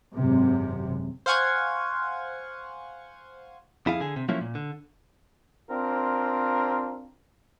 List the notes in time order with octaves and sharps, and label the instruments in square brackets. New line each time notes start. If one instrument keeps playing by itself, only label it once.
[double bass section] G#1 F#2 C3
[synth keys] C5 F5 F#5 G#5 C#6 G#6
[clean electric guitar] F2 E4 G#4 F5
D3 G#4
C3
F3 F#3 A3 A#3 C#4 E4
A#2
D3
[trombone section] C4 D4 F4 A#4